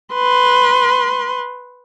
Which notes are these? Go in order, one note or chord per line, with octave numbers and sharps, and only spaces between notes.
B4 C6